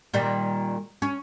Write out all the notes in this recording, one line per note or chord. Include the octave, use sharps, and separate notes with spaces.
A#2 D#3 G3
C#4